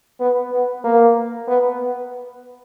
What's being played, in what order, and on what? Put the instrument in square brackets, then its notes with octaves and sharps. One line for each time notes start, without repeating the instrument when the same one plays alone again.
[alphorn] B3
B3
A#3
B3